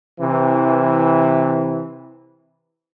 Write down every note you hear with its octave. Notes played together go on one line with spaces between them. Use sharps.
C3 E3